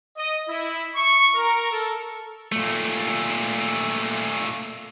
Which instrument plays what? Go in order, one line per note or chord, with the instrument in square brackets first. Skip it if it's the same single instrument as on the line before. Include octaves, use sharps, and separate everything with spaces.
[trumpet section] D#5
E4
C#6
A#4
A4
[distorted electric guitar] A#2 A3